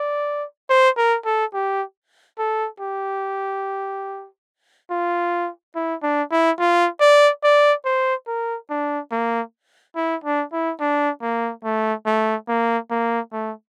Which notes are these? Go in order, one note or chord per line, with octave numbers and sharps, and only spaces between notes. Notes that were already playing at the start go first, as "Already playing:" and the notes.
Already playing: D5
C5
A#4
A4
G4
A4
G4
F4
E4
D4
E4
F4
D5
D5
C5
A#4
D4
A#3
E4
D4
E4
D4
A#3
A3
A3
A#3
A#3
A3